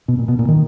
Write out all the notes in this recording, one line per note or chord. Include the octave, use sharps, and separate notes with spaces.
B2
A#2
B2
A#2
D#3